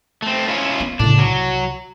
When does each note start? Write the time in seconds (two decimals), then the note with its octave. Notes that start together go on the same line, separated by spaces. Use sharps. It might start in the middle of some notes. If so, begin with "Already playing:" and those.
0.22 A3 C4
0.48 C#4 E4 F4
0.80 B3
0.99 A2 C#3 D4
1.19 C2 F#3